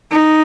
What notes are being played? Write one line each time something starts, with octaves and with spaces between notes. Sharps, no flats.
D#4